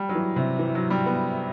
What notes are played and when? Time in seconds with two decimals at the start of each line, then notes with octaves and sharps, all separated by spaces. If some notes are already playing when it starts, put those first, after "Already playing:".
Already playing: G3
0.09 F#3
0.15 E3
0.36 C3
0.59 E3
0.75 F#3
0.90 G3
1.06 B3